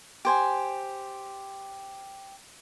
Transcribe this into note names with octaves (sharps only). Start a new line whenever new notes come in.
G4 C5 G#5